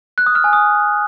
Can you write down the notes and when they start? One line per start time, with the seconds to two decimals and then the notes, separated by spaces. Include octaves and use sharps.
0.18 F#6
0.26 D#6
0.35 F6
0.44 G#5
0.53 D#6